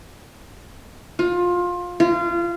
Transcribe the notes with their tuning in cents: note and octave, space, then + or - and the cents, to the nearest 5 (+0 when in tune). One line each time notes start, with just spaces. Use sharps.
F4 +20
F4 -25